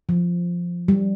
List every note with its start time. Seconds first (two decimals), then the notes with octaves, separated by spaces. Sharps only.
0.09 F3
0.88 G3